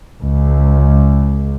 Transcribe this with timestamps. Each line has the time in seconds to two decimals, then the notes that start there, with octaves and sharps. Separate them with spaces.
0.22 C#2